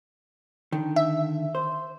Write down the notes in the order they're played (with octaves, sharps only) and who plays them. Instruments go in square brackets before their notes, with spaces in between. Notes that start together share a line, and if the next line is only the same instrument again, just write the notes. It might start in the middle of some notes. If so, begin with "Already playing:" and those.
[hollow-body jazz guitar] D3 D#3
[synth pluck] E5
[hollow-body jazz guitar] C5